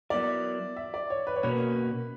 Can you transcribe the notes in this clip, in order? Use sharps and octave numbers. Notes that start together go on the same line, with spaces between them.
F#3 B3 E4 A#4 D5
E5
D5
C#5
B4
C#5
B2 A#3 C#4 F#4 A#4 B4